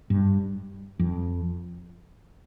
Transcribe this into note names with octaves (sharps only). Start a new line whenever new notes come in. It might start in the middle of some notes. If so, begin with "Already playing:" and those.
G2
F2